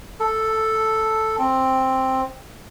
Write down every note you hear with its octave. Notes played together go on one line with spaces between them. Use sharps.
A4
C4